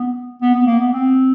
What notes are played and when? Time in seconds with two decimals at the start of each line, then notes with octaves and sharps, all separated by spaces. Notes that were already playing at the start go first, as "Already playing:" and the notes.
Already playing: B3
0.41 B3
0.54 B3
0.66 A#3
0.79 B3
0.93 C4